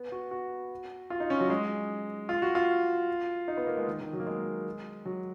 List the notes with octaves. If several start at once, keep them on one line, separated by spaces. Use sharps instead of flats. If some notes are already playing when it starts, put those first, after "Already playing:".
Already playing: B3
F#4
F#4
F4
D#4
C#4
F#3
G#3
F4
F#4
F4
D#4
B3
A#3
G#3
D#3
D#3
F#3
A#3
G#3
F#3